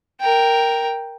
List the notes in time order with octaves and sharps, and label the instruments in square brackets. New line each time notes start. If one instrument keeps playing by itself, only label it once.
[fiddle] A#4 G5